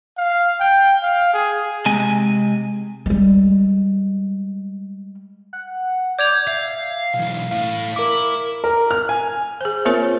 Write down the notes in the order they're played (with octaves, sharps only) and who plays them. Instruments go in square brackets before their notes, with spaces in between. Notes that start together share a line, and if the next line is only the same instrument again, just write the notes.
[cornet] F5
G5
F5
G#4
[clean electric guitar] C3 G#3 G#5
[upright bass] G3 G#3
[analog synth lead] F#5
[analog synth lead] D5 [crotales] G6 G#6 F7
[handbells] E5 [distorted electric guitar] F5
[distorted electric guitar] B1 E3 [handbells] F5
[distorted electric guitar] A2 [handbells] F5
[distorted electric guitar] E4 [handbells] A#4 D6
[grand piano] A#4
F6
G#5
[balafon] G#4 C5
A#3 C4 F4 A#4 C5 C#5